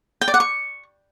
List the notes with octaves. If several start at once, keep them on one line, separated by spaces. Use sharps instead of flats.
G5
D5
F#5
C#6